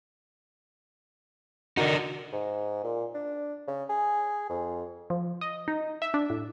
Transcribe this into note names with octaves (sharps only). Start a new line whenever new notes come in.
D3 D#4 F#4 A#4 D5
G#2
A#2
D4
C#3
G#4
F2
F3
D#5
D#4
E5
D4
A2